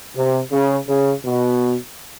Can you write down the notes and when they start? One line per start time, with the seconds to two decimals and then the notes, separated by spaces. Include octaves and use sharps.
0.15 C3
0.52 C#3
0.88 C#3
1.25 B2